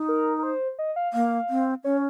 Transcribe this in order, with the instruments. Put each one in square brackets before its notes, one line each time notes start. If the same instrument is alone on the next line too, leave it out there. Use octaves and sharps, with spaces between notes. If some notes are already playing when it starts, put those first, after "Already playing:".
Already playing: [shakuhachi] D#4
[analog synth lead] A#4
A#4
C5
D#5
F5
[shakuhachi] A#3 [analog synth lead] F5
[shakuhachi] C4
[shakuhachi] C#4 [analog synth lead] C#5